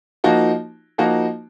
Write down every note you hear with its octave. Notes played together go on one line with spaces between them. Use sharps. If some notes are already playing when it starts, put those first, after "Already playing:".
F3 A#3 D#4 F#4
F3 A#3 D#4 F#4